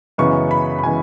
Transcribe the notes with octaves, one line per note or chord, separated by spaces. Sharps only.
F#2 C#3 E3 G#3 B3 C#6
B5
B5
C#3 E3 G#3 B3 G#5